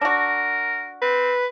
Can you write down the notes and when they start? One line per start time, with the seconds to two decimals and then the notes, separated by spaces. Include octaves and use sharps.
0.01 D4 F#4 A#4
1.02 C4 B4